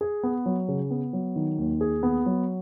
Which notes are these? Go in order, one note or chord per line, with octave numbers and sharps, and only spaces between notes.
G#4
B3
F#3
C#3
B3
F#3
D#3
D#2
G#4
B3
F#3